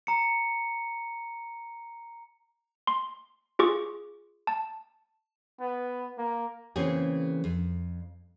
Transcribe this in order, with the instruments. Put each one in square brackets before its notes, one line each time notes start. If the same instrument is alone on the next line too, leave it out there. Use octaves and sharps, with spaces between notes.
[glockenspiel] A#5 C#7
[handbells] C6
F4 G#4 C#6 D6
A5
[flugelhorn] B3
A#3
[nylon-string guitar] C#3 E3 A#3 C4 C#4 G#4
F2